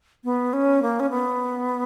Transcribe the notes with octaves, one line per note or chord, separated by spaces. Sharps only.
B3
C#4
A#3
C#4
B3